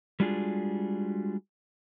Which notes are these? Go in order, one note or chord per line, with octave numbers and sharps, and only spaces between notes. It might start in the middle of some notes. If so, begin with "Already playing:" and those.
G3 G#3 D4 F4 F#4 G#4